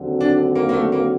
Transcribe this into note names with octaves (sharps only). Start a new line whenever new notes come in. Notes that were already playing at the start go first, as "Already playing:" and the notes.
Already playing: D#2 D3 F#3 C4 F#4
D4
A#3
A#3
A3
A#3